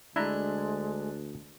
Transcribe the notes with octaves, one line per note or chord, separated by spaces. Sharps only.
D2 G#3 D4 E4 D5 E5 A#5 F#6